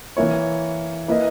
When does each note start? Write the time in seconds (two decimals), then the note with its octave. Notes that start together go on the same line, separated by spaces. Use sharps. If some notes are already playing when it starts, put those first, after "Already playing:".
0.17 E3 A#3 E4 A#4 C#5
1.08 A#3 E4 B4 D#5